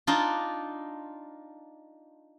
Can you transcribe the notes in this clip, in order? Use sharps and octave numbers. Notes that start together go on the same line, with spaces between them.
D4 D#4 F4